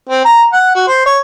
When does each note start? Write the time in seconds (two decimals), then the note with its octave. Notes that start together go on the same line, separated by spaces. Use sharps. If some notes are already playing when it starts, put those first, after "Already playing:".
0.09 C4
0.25 A#5
0.53 F#5
0.75 F#4
0.88 C5
1.06 C#5